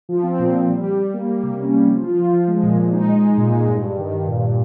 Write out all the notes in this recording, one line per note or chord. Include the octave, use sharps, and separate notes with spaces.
F3
C4
A#2
A#2
G3
G3
G3
A#3
G3
C3
C#4
G3
F3
F4
F3
F3
G#3
A#2
A#2
D#4
G#3
G#3
A#2
G#3
G2
G2
D#3
G2
A#2
A#2